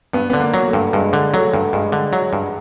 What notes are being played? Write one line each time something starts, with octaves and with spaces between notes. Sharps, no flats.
G2 B3
D3 B3
A#3
F#3
A3
G2
G2 G#3
D3
F#3 A3
G2
G2 G#3
D3
F#3
G2